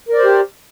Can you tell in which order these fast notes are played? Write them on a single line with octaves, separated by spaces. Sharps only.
A#4 D5 C5 G4